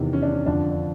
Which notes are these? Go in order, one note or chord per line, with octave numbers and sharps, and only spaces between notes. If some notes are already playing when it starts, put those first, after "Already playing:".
Already playing: E2 C3 D#3
C#4
D4
C#4
F2 D3 F3 D4
D4